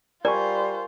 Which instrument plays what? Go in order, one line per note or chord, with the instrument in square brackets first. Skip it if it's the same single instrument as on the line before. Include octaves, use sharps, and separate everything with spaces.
[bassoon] G3 [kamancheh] F4 C5 [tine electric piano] A#4 G#5 C#6 [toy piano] D5